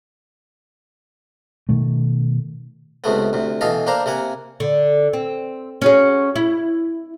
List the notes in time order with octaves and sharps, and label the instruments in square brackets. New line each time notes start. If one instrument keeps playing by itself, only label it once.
[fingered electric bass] B2 D#3 A3
[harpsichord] C#2 C3 A3 B3
D2 C3
B2 E3 A4 D#5 F5
A#3 D4 C5 F5 A#5
C3 A#3 F#5 G#5
[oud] D3
C4
C#4 F#4 G#4
E4